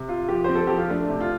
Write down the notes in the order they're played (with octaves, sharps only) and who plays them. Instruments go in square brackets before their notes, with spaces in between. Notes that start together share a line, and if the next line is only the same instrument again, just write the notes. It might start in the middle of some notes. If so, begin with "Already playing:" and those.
Already playing: [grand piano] C3
F4
[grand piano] F3 [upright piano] G4
[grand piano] C4 [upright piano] C5
[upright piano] A4
[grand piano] F3 [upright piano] G4
[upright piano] F4
[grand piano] A3 [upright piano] D4
[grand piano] C3
[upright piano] F4